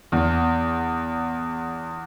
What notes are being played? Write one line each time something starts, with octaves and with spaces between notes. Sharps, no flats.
E2